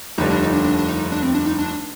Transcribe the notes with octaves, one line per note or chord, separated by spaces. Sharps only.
F1 D#2 D3 G3 D#4
D4
D#4
D4
D4
D4
D#4
D4
C4
D4
D#4
D4